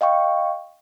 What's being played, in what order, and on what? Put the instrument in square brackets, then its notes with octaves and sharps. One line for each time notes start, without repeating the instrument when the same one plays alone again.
[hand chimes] D#5 F5 G5 C#6